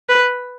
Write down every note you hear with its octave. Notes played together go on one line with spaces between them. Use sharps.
B4